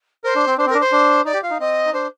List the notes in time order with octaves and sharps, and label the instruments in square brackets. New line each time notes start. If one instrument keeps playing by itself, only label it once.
[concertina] A#4 [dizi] C5
[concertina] D4
C4
[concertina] D4 [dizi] C5
[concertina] C4
[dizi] A#4
[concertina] D4
[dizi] C5
[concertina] D4
[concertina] D#4 [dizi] D5
[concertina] G4
[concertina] F4 [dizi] F5
[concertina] D#4
[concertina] C4 [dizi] D#5
[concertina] D#4
[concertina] D4 [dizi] C5